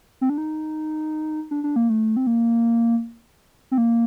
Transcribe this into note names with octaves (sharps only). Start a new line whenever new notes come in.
C4
D4
D#4
D4
D4
A#3
A3
C4
A#3
C4
A#3